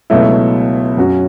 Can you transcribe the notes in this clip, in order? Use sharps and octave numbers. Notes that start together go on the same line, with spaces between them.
C#2 B2 F#3 A3 E4
F#2 F#3 C#4 F#4